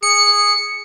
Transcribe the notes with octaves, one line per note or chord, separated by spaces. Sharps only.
G#4 C#7